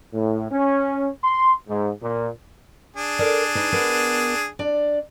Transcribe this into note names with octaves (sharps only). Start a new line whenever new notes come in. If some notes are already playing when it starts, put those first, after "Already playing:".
A2
C#4
C6
G#2
A#2
D4 G#4
A4 A#4 D5
D#4 B4
B3 A#4 B4
D4 D5